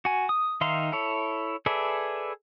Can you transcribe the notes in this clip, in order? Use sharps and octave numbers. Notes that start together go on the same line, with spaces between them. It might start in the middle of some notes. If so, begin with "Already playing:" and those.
F#4 G#5
D#6
D#3 D#4 E5 F5 C6
E4 A4 C#5
G#4 A4 B4 D5 E5